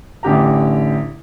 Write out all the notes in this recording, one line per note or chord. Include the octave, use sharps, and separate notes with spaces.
A1 D3 G4 A#5